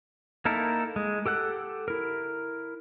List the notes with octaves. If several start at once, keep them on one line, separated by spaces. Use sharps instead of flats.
A#3 D#4 E4 A4 A#4
G#3
G4 A4 F#5 F#6
E4 A#4